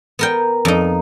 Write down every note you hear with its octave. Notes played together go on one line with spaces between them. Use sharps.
B3 A#4 G5
F2 D#4